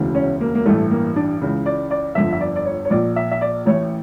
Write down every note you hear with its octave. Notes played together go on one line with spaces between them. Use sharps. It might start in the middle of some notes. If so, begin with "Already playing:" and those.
Already playing: E1 D2 C#3 E3
C#4
A#3
A#3
A1 G2 E3 A3
A#3
D4
C#2 C#3 E3
D5
D5
G1 F2 D3 E5
E5
D5
D5
C#5
C#5
A#1 A#2 D5
E5
E5
D5
A1 A2 E3 C#5